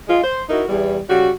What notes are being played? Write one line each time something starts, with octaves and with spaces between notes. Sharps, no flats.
G#3 F4
C5
D#4 E4 F#4 A#4
E2 G3
C#3 G3 F#4